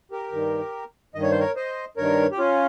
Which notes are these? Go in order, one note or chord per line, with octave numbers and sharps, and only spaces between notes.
G4 A#4
G2 D#3
G2 D#3 D#5
C#5
C5
A#4 C#5
C5 D#5
G2 D#3 A#4 C#5
G4
C#4 F4